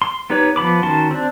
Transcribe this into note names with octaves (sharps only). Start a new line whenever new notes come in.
C6
B3 D#4 G4 B4 C#5
F3 B3 B5 D6
D#3 C#4 F#4 A5 C6
C4 D4